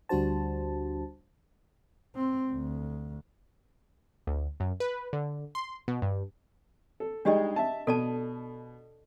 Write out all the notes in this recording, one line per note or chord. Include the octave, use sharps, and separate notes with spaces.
D2 G3 D4 F#4 C5 A5
C4
D2
D2
F#2
B4
D3
C6
B2
G2
A4
G3 G#3 D4 D#4 G4 D#5
E5 A5
B2 A4 D5 A5